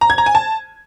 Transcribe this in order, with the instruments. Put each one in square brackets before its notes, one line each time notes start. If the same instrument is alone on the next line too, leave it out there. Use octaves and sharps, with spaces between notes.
[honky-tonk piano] A#5
G#6
A#5
G#5
A5